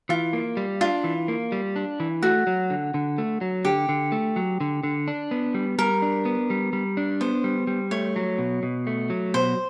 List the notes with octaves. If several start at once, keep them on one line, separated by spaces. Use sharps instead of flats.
E3 F4
A#3
G3
D4 F4
E3
A#3
G3
D4
E3
A3 F#4
F#3
D3
D3
A3
F#3
D3 G4
D3
A3
F#3
D3
D3
D4
B3
G3
G3 A#4
D4
B3
G3
G3
D4
B3 C5
G3
G3
A3 C#5
F#3
B2
B2
A3
F#3
B2 C5